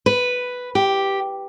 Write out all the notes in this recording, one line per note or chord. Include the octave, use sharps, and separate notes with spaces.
B4
G4